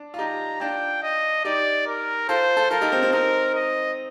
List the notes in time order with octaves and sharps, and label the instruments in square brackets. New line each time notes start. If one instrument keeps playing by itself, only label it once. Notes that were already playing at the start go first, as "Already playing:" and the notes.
Already playing: [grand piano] D4
F4
[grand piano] D#4 G4 [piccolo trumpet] A#5
[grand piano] D4 F4 [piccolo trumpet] G5
[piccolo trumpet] D#5
[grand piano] D#4 G4 [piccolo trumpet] D5
[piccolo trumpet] A#4
[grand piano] F4 A4 [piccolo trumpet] C5
[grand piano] F4 A4
[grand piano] F4 A4 [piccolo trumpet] A#4
[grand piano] D#4 G4
C4 D#4
C4
[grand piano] C4 D#4 [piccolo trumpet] A#4
[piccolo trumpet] D#5